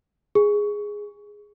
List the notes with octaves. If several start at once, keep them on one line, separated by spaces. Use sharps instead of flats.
G#4